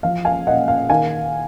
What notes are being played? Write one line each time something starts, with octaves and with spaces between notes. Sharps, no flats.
F3 F5
F5 G#5
A#2 D#5 F#5
F5
D#3 F5 G#5